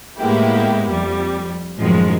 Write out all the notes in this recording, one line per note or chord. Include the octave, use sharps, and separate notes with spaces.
A2 G#3 A#3 B3 E4 G4
F2 G3
F#2 A2 D#3 F3 F#3 G#3